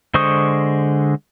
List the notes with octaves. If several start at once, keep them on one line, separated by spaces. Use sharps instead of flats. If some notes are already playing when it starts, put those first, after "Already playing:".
D3 G#3 C5 C#6 D#6